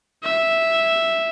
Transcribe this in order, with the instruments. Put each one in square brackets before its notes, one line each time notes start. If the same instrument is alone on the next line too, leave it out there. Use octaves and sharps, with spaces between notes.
[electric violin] E5